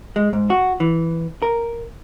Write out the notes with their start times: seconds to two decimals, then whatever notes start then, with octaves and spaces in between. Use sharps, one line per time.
0.16 G#3
0.33 G#2
0.50 F#4
0.80 E3
1.42 A#4